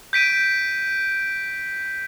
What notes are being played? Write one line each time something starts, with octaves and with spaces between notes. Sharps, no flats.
G6 B6 D7 D#7